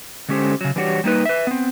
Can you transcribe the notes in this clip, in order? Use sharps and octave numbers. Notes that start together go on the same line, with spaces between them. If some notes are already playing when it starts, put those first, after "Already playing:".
D3 G#3 C#4 G4 A4 C5
C#3 F#3
E3 G3 D4 F#4 G4 C#5
G3 A#3 D#4 B4
B4 E5
B3 C4